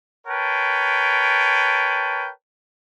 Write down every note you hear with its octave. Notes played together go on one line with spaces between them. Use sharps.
A#4 B4 C#5 G5 A5